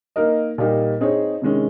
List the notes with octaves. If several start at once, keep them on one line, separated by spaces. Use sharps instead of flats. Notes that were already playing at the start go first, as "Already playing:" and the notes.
A#3 D#4 A#4 D#5
A#2 G3 A#3 D#4 G4
C4 D#4 G#4 C#5
C3 D#3 G#3 C#4